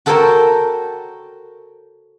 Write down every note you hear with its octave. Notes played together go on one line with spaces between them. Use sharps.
F#4 A4 A#4 C5 C#5 G5